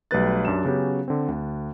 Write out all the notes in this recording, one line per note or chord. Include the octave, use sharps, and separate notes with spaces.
B1 G3 A3 B4 F#6 A6
F#2 D4 G4 E7
C#3 F#3 B3 C#4 G4
D3 C4
D2